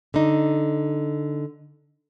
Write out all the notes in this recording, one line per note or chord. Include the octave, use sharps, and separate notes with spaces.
D3 D#4